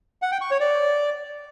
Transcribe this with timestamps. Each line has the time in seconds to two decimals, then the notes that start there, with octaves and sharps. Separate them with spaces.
0.22 F#5
0.32 G5
0.41 C#6
0.51 C#5
0.60 D5